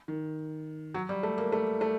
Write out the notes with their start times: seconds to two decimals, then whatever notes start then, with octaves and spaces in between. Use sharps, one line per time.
0.08 D#3
0.94 F#3
1.09 G3
1.23 A3
1.38 A#3
1.52 A3
1.81 A3